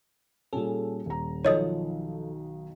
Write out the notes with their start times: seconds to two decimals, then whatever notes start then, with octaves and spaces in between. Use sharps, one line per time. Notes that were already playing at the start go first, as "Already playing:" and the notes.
0.53 A#2 G3 C#4 G#4 A4
1.06 D#1 A#5
1.45 B1 D#3 F3 F4 A4 C#5 D#5 D#6